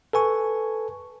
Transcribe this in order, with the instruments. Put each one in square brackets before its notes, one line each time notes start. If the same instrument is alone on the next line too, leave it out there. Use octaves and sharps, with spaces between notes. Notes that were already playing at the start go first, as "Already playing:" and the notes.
[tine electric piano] A4 B4 G#5 C#6